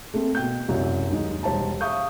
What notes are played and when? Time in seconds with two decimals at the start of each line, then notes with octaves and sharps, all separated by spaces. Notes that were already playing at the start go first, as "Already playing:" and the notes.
0.14 A3 A#3 C4
0.35 B2 G5 G6
0.68 C2 F#2 G#3 E5
1.10 D#2 F#3 G#3 D#4
1.43 E1 G3 C5 C#5 A5 A#5
1.81 E5 F5 C#6 D#6 G6